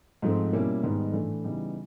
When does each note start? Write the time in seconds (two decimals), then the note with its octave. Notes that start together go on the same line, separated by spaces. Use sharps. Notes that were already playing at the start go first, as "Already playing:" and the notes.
0.22 G#2 F3 A3 C4
0.53 B2 G3 A#3 C#4 E4
0.83 G#2 D#3 G3 B3
1.13 A2 E3 A3 D4
1.44 C#3 E3 G3 B3 D#4